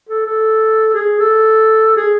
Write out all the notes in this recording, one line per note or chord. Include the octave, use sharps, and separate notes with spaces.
A4
A4
G#4
A4
G#4